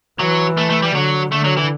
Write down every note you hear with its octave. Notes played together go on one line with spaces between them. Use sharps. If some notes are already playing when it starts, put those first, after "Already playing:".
E3 F#3
A3
A3
G3
D3 F#3
D3 A3
F#3
E3